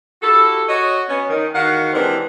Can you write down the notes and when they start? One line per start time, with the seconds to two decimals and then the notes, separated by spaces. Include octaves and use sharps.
0.22 E4 F#4 G4 A4
0.68 F#4 C#5 D#5
1.09 B3 C#4
1.30 D#3
1.54 E2 D#3 F#4 F5 F#5
1.93 C3 E3 G#3 C4 D4 A#4